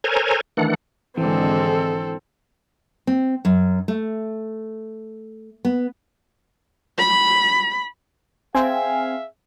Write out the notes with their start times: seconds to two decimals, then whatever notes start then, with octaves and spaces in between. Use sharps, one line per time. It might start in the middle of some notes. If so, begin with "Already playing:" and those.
0.04 A4 A#4 C5 C#5 G#5 A#5
0.57 D#3 E3 A3 D4 F#5
1.17 G#1 D3 E3 G#3 C4 A4
3.07 C4
3.45 F#2
3.88 A3
5.65 B3
6.99 B5
8.55 C4 G#4 E5 F5 G#5